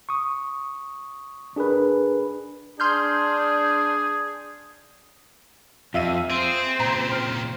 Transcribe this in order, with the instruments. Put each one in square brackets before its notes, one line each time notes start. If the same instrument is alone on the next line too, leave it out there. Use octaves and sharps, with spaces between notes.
[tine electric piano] C#6 D#6
D4 G#4 A#4 B4
[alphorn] D4 [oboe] G#4 [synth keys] C6 F6 G6
[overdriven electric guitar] F2 [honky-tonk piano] F4 E5 D#7
[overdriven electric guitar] C4 [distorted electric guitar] G#4 [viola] C5
[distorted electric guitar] A#2 C#3 [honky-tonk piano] A#5
[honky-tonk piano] F6